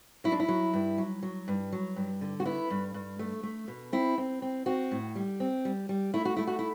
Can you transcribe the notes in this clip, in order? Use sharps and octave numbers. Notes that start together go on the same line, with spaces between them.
F#3 E4
D4
E4
F#3
G2
F#3
F#3
G2
F#3
G2
D3
F#4
B3 E4
G2
G2
A3
A3
B2
C4 E4
C4
C4
C4 F#4
A2
G3
C4
G3
G3
A3 E4
F#4
A3 E4
F#4
E4